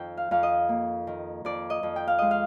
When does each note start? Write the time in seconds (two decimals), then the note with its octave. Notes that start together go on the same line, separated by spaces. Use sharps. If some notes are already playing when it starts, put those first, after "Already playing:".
Already playing: F2 D#3 G5
0.17 F5
0.31 F2 F5
0.43 D#5
0.69 A#3
1.07 D#3
1.45 F2 D5
1.70 D#5
1.83 F2
1.96 G5
2.08 F5
2.18 G#3 D#5
2.31 F5